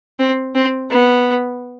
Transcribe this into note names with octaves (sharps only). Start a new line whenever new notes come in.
C4
C4
B3